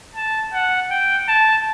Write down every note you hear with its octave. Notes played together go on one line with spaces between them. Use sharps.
A5
F#5
G5
A5